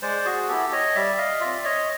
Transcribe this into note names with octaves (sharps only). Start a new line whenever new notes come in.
G#3 C5 D5
F#4 G#4
B3 E4 G4 A4
C#5 D#5
G3 D5 E5
D#5 F5
C4 F4 D5 E5
C#5 D#5